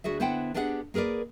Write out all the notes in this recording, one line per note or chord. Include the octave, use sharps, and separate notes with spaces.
D2 F#4 G#4 E5
D3 B3 E4 C5 F#5 G5
B3 D4 G4 G#4 E5 F#5
A#3 G#4 A#4 B4 D5